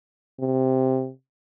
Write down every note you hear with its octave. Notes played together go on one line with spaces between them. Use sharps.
C3